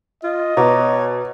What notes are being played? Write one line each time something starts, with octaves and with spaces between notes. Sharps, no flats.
F4 D#5
B2 C#5 A#5 D6